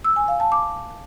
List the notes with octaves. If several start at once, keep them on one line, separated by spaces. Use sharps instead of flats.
E6
G#5
F5
A5
D6